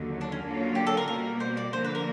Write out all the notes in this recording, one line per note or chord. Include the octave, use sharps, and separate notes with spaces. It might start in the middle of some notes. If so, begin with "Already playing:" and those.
Already playing: D#2 D3 F#3
D4
C#4
D3 F#3 A#3 C#4 F4
G4
A4
A#4
B2 G3 A#3 A#4
C5
D5
D3 F3 A#3 C5
B4
A#4